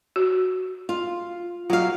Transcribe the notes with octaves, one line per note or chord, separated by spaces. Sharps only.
F#4
F4
F#3 F4 F5